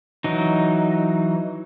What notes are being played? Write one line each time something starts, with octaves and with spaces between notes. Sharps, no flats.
E3 F#3 D#4